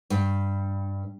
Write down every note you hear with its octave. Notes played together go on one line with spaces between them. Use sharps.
G2